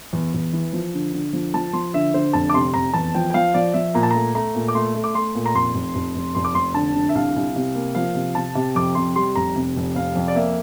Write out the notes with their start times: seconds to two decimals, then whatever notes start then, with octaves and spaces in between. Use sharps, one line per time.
0.13 E2
0.34 E2
0.53 E3
0.73 F3
0.94 D3
1.13 D3
1.33 F3
1.54 F3 A5
1.73 F3 C6
1.94 D3 E5
2.14 D3 C5
2.33 F1 A5
2.49 D6
2.54 C3 C6
2.74 F1 A#5
2.94 E2 A5
3.15 F3 G5
3.30 G5
3.34 F3 F5
3.54 F3 D5
3.74 F3 E5
3.94 A#2 A#5
4.03 A5
4.11 A3 A#5
4.35 A3 A#5
4.55 A#2
4.68 D6
4.75 A3 C6
4.95 A3
5.04 D6
5.15 A3 C6
5.35 A#2
5.46 A#5
5.54 F1 C6
5.74 F1
5.95 F1
6.15 F1
6.35 F1 C6
6.44 D6
6.55 F1 C6
6.74 D3 A5
6.95 D3
7.09 E5
7.15 C2 F5
7.36 C2
7.56 C3
7.75 A#3
7.95 F3 F5
8.15 C3
8.35 C3 A5
8.55 C3
8.75 F2 D6
8.95 C3 C6
9.16 G3 C6
9.35 F1 A#5
9.56 C3
9.76 F1
9.95 C3 F5
10.15 F2
10.28 D5
10.35 A#3 E5